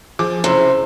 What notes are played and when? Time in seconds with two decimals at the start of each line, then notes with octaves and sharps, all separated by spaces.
0.19 F3 G#4 D6
0.44 F#1 C3 E4